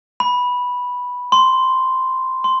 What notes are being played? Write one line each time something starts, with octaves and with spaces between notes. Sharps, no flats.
B5
C6
C6